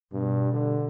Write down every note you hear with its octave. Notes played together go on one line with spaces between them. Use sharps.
G2 B2
D3